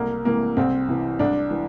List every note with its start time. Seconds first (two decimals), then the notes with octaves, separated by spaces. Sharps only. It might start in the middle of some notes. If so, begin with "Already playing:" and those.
Already playing: C2 A#3
0.25 C3 E3 A#3
0.57 C2 C4
0.88 C3 E3
1.19 C2 D4
1.51 E3